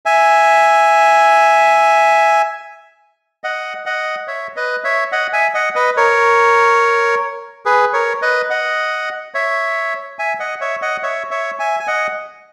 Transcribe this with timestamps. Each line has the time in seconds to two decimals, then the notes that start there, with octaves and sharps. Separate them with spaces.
0.06 E5 G#5
3.44 D#5 F#5
3.86 D#5 F#5
4.28 C#5 E5
4.56 B4 D#5
4.84 C#5 E5
5.12 D#5 F#5
5.33 E5 G#5
5.54 D#5 F#5
5.75 B4 D#5
5.97 A#4 C#5
7.65 G#4 B4
7.93 A#4 C#5
8.22 B4 D#5
8.50 D#5 F#5
9.34 C#5 E5
10.19 E5 G#5
10.40 D#5 F#5
10.61 C#5 E5
10.82 D#5 F#5
11.03 C#5 E5
11.31 C#5 E5
11.59 E5 G#5
11.80 G#5
11.87 D#5 F#5